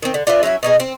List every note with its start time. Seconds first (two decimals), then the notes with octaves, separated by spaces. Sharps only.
0.02 D#3 C4
0.14 D3
0.27 D4 F4 B4 E5
0.43 F#3 C#4 E4 E5
0.63 B2 D#4 G#4
0.80 C4